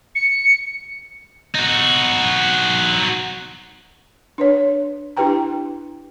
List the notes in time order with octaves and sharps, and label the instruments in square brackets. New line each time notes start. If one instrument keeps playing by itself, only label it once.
[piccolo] C#7
[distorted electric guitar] D#4 F#4
[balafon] D4 B4 C#5
D4 E4 G4 B4 G5 A#5